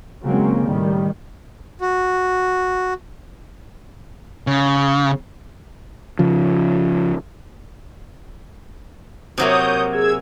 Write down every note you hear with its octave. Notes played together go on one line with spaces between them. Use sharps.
C#3 F#3 G#3 A#3 C4 C#4
A2 D#3 G3
F#4
C#3
C#3 F3
C3 F#3 A#3 C#5 D#6 G6
G#4 E6 G#6